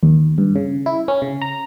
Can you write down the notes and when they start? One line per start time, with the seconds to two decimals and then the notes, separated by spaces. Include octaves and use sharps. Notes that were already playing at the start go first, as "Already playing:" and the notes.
0.03 D#2
0.38 G2
0.56 C#3
0.86 E4
1.08 C#4
1.22 C#3
1.42 A#5